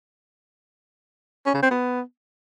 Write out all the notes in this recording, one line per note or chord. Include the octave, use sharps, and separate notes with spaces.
C#4
C#3
C4
B3